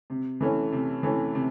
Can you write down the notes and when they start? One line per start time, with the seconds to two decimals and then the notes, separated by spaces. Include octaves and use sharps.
0.10 C3
0.41 E3 A3 C#4
0.72 C3
1.03 E3 A3 C#4
1.35 C3